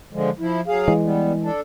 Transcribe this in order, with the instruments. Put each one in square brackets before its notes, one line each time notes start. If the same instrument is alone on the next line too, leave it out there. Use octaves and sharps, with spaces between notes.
[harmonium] D3 F3 G#3
F3 E4
F#3 G#4 F5
[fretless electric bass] E3 G#3
[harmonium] G3 B3
D4 A4